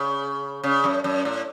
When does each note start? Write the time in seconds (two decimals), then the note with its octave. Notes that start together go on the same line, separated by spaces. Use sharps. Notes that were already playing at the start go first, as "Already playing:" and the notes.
Already playing: C#3
0.63 C#3
0.84 F#2
1.04 F#2
1.25 A2